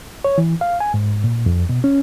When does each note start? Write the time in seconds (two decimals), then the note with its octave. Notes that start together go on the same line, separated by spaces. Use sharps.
0.25 C#5
0.38 E3
0.61 F5
0.80 G#5
0.94 G#2
1.24 A#2
1.46 F2
1.69 B2
1.84 C#4